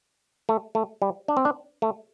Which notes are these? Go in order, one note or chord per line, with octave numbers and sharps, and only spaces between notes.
A3
A3
G3
D4
C4
D4
A3